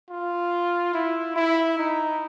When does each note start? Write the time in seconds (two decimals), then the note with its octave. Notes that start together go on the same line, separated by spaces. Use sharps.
0.10 F4
0.94 E4
1.36 E4
1.77 D#4